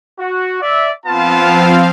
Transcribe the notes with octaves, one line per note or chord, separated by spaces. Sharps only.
F#4
D5 E5
F3 B3 C4 F4 F5 A5